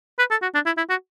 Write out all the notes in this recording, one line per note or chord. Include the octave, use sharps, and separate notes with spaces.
B4
A4
F#4
D4
E4
E4
F#4